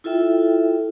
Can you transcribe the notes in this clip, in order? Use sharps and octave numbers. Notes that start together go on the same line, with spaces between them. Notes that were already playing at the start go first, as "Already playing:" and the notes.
E4 F4 A4 E5 G5